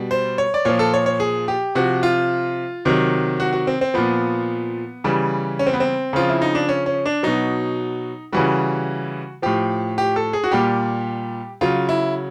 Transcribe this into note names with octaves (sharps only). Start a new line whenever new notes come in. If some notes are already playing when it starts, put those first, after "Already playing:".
Already playing: B2 G3
C5
C#5
D5
A#2 F3 C#5
A4
C#5
C#5
G#4
G4
C3 F3 F#4
F4
C3 D#3 F#3
F#4
F#4
C4
C4
A#2 F3 B3
C#3 E3 G3
C#4
C4
B3
C4
C#3 F3 F4
E4
D#4
D4
C#4
C#4
D4
B2 F#3 D#4
C#3 E3 G3 F#4
A2 F3 G4
G4
A4
G#4
F#4
A#2 G3 G4
C#3 F#3 F4
E4